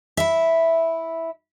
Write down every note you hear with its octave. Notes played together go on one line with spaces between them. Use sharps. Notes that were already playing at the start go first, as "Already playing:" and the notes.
E4 E5